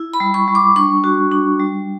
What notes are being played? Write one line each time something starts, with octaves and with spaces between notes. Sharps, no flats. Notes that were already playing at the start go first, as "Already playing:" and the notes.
Already playing: E4
B5
G3
C#6
G3
D6
D4 C#6
F#4
D4
G3